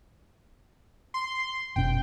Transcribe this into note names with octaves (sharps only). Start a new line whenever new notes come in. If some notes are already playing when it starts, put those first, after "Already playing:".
C6
F1 B2 C#4 G5